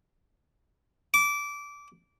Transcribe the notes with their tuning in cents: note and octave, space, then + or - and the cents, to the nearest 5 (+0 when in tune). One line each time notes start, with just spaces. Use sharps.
D6 -20